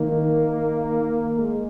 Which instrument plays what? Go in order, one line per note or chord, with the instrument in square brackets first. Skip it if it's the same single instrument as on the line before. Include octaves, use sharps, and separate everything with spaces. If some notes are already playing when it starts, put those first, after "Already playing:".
Already playing: [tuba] D#3 [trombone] A#3
[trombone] G#3